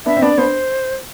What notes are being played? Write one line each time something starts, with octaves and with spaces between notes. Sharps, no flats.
B3 D4 E5
C4
B3 D4 D5
B3 D4 C5